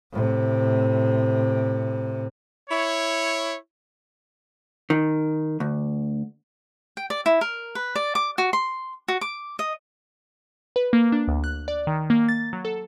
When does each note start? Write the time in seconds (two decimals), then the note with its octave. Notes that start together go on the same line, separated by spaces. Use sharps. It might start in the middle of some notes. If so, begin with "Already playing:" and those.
0.12 A2 C3
2.70 E4 C#5
4.90 D#3
5.60 D2
6.97 G5
7.10 D5
7.26 E4
7.41 A#4
7.75 B4
7.95 D5
8.15 D6
8.38 F#4
8.53 C6
9.08 F#4
9.21 D6
9.59 D#5
10.76 B4
10.93 A#3
11.12 D4
11.28 D2
11.44 F#6
11.68 D5
11.87 D#3
12.10 A#3
12.29 A6
12.53 F#3
12.65 A4